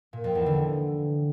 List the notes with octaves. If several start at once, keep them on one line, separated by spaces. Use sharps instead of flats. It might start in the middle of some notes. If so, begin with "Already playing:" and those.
A#2
F2
E2
D3